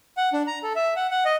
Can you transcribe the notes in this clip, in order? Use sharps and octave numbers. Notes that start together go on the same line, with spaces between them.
F#5
D4
A#5
A4
E5
F#5
F#5
D#5